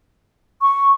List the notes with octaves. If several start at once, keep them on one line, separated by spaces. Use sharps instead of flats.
C#6